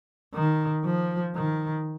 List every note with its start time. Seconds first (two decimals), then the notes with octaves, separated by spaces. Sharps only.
0.34 D#3
0.84 F3
1.35 D#3